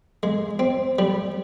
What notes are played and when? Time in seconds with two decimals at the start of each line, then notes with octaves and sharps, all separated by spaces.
0.23 G#3
0.59 C4
0.99 G3